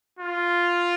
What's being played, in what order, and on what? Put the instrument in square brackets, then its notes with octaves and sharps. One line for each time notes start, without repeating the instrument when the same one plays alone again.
[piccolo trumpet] F4